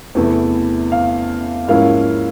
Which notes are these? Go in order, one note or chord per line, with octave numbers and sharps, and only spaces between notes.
E2 C3 E3 A3
F5
G#2 F3 A#3 C#4 E4 F5